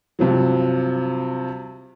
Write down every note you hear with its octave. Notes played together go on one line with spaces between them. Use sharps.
G2 C3 F3 F#3